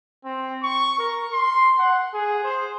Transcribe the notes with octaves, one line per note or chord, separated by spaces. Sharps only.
C4
C#6
A#4
C6
F#5
G#4
C5